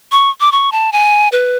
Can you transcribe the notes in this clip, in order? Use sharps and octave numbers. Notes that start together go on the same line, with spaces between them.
C#6
D6
C#6
A5
G#5
B4